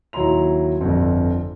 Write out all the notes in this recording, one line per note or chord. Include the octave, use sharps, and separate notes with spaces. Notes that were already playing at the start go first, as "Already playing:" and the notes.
D#2 F#3 E4 A#5 C6 F7
G1 F2